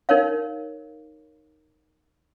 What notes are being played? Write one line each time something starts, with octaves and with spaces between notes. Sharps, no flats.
D#4 A#4 C#5 F5